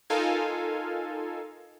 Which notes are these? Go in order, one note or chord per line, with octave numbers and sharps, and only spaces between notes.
D#4 F4 A4 A#4 F5 G#5